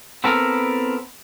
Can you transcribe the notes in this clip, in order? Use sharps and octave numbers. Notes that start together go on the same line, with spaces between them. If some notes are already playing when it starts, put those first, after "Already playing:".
B3 C4 E4 A4 A#4